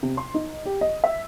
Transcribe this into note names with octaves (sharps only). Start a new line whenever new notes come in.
C3
C6
D#4
G4
D#5
E5